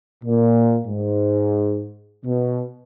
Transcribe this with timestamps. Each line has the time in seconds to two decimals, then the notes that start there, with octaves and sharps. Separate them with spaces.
0.24 A#2
0.86 G#2
2.25 B2